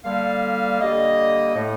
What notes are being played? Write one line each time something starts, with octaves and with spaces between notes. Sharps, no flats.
D3 G3 A#3 F5
D3 G3 A#3 D#5
A2 A3